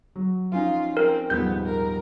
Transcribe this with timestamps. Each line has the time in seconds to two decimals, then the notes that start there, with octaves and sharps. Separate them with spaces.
0.16 F#3
0.52 F3 C#4 D#4 F4
0.97 C4 A#4
1.30 D#1 G#2 F3 B3 G6
1.66 A#4